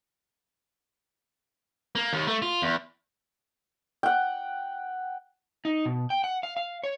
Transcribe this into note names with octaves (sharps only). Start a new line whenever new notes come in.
A#3
D#2
A3
F4
E2
F#5 G5
D#4
B2
G5
F#5
F5
F5
C#5